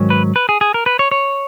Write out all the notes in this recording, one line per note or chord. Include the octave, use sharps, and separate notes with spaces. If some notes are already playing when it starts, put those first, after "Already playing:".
Already playing: G#2 D#3 F#3 C#4
B4
B4
G#4
G#4
A#4
B4
C#5
C#5